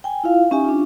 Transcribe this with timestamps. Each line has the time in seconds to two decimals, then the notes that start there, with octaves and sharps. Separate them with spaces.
0.04 G5 G#5
0.24 E4 F4 F5
0.51 C#4 D#4 G4 E5 G#5
0.64 D4 F4